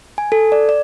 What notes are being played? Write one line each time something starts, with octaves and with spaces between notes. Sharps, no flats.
G#5
A4
D5
D5